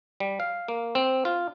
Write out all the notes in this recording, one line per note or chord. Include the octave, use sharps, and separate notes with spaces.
G3
F5
A#3
C4
F4